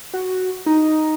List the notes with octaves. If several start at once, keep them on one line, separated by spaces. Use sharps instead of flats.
F#4
D#4